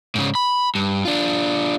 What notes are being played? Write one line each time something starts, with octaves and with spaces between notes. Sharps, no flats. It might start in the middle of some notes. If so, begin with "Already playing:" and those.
G#2 C#3
B5
G2
D4 F4